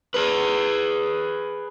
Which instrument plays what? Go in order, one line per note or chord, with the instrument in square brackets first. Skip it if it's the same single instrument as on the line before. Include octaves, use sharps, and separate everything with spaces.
[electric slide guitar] G#4 B4